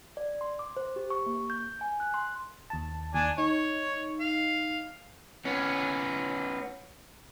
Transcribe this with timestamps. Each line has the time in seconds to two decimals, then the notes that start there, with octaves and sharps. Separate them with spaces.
0.17 D5
0.41 C6
0.59 D6
0.77 C5
0.96 G4
1.10 C#6
1.26 A#3
1.50 G6
1.81 G#5
2.00 F#6
2.14 C6
2.70 D#2 A5
3.14 D#2 D4 G#5
3.38 D#4 C#5
4.20 F5
5.45 B3 C#4